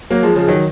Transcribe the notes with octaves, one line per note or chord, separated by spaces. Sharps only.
F#3 A#3
F3 G#3
C#3 F3
D#3 F#3